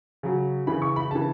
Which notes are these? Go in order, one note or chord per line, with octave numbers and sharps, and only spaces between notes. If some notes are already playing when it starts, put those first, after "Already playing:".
C#3 F#3
C#3 E3 B5
C#6
B5
C#3 E3 A5